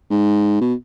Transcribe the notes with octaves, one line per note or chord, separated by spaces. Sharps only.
G#2
B2